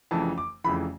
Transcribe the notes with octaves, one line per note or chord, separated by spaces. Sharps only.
F1 F2 C#3 E3 A5
D6
F1 F2 C#3 E3 B5